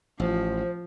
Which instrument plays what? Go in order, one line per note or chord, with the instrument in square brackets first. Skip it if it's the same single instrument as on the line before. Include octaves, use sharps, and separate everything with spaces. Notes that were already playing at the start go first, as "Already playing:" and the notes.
[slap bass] A1 [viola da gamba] F3 [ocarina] C5